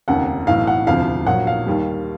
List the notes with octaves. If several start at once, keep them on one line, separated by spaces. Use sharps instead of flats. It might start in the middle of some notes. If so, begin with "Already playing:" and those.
F1 D#2 C#3 F#5
B1 A2 E3 F5
F#5
E1 D2 C3 F3 F5
A#1 A#2 F#3 F#5
F5
D#2 D#3 G3